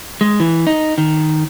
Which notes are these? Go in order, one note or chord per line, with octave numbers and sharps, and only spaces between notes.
G#3
E3
D#4
D#3